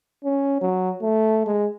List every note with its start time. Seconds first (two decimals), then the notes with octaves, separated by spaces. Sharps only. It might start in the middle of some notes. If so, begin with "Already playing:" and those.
0.24 C#4
0.61 F#3
1.02 A3
1.46 G#3